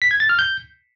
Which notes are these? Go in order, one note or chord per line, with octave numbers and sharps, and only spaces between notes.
B6
G#6
A6
F6
G6